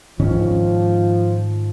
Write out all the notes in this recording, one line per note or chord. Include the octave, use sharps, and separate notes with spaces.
G#2 D#3 F3 C#4